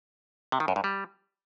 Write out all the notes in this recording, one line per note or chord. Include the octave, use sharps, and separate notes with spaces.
C3
D#3
F#2
G2
G3